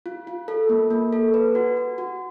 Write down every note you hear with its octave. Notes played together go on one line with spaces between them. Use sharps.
F4
F4
A4
A#3
A#3
A4
B4
F#4
F#4
F#4